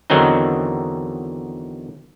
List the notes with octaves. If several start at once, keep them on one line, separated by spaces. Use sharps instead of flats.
E2 D3 D#3 F#3 C4 D#4